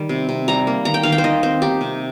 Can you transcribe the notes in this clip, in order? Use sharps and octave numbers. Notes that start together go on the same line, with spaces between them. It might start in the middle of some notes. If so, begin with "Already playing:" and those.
Already playing: D#3 G3
C3
C3
G3 A#5
A#3
D#3 A#5
G5
D#3 F5
G5
C5
D#3 D#5
C4 C5
D#4 G4
C3